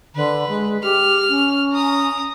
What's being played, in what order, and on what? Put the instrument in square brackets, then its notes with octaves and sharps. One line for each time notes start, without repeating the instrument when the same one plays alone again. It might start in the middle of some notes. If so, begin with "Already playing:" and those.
[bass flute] D3 [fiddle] B4
[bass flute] G#3
[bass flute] G4 [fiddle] F6
[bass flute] C#4
[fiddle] A#5 D#6